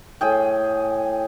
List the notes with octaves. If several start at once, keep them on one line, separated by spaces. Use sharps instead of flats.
A2 G#4 G5